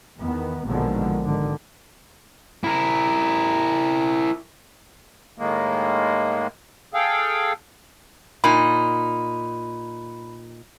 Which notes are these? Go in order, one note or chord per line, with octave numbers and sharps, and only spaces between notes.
E2 D#3 B3
A#1 B2 D3 D#3 F3 G#3
G#1 D3 D#3
E4 A#4
A2 D#3 G#3 A#3
G#4 A4 F5 G5
A#2 D#4 B5